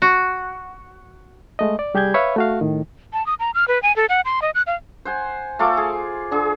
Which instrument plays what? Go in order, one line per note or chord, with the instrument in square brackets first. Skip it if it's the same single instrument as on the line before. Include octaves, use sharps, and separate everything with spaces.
[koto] F#4
[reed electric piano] G#3 A3 D#5
D5
C2 G3 G4 G#4 G6 G#6
B4 C#5 E5 F5 B5
A3 F#4 F5
A2 D#3
[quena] A5
D#6
A#5
F6
B4
G#5
A4
F#5
C6
D#5
F#6
F5
[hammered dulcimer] C5 F#5 G#5
A3 F4 A4 D6
G#4
D3 G#4